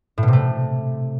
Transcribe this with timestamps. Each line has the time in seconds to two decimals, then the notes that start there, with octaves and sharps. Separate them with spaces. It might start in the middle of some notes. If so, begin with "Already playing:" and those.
0.18 A2
0.23 B2
0.28 C3
0.33 A3